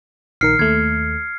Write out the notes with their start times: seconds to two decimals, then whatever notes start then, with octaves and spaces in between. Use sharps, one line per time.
0.41 A#1 D#3 A#4 F6 C7 C#7
0.59 D#2 A3 G#6